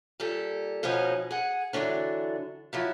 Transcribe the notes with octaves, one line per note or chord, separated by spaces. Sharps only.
A#2 G3 A4
B2 F3 C#4 D#4 G#4
G#4 F#5
D3 E3 F#3 C#4 D4
F3 F#3 E4